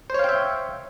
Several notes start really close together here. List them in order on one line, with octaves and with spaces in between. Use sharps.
C5 C#5 F5 G5 E5